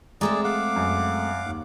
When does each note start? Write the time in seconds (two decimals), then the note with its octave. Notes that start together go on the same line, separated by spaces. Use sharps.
0.21 G#3 A3 C4 G#4 D5 A#5
0.44 F5 F#5 D6
0.76 F#2
1.46 D#2